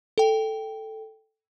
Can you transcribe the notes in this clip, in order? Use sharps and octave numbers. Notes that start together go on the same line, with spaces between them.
A4 G5